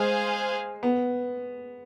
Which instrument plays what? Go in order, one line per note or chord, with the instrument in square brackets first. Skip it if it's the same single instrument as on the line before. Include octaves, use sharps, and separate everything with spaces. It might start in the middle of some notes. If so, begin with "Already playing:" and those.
Already playing: [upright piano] G#3 [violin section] G#4 C5 F5 G#5
[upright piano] B3